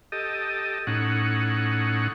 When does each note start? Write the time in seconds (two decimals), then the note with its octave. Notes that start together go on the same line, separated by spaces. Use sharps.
0.12 G4 A4 D#5
0.87 A2 C#4 D#4 F#5